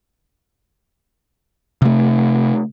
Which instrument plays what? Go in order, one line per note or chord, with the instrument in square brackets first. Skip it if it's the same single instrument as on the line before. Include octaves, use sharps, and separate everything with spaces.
[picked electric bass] C3 A3